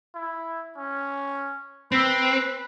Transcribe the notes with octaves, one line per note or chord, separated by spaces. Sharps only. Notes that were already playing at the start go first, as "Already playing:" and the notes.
E4
C#4
C4 B4 E6 B6 C7